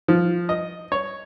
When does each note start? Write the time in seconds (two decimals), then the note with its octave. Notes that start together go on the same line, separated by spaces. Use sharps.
0.08 F3
0.49 D#5
0.92 C#5